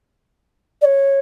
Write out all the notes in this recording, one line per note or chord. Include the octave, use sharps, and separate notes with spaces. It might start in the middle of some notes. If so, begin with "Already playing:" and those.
D5
C#5